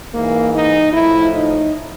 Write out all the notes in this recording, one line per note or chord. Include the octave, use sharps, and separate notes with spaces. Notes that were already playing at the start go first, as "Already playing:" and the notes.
G#2 E3 A#3
D#4
A2 F3 E4
D#4